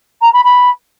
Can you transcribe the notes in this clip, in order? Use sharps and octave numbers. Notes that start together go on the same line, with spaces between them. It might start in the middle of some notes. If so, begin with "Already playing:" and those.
A#5
B5
B5